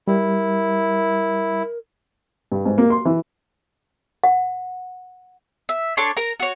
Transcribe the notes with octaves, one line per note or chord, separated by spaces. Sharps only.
G3 E4 A#4
G2
G#2
A#3
C6
E3
F#5
E5
D4 A4 C#5 C6
A#4 A#5
F#4 C#5